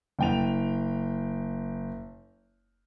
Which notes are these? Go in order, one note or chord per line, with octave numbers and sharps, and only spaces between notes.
F#1 G5 F7